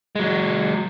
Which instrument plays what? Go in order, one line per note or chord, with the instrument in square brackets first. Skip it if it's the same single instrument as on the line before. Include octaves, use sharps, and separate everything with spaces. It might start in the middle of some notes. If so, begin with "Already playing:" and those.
[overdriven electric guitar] F#3 G#3